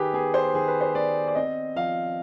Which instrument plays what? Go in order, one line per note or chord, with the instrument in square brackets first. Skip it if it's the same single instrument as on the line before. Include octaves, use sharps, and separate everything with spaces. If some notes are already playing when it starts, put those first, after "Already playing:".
Already playing: [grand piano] D#3 G4 G#4 B4
B3 G#4
C5
D#3 G#4
B4
C5
B3 D5
D5
C4 D#5
F3 F5